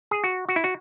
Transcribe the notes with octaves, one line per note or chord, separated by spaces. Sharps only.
G#4
F#4
F#4
E4
F#4